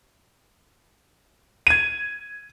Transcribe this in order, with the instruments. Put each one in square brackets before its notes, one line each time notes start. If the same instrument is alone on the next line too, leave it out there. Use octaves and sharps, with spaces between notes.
[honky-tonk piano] G#6 D#7